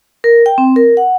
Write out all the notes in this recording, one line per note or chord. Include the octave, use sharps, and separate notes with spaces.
A#4
G5
C4
A#4
F#5